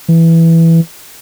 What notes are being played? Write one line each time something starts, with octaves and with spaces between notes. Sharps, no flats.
E3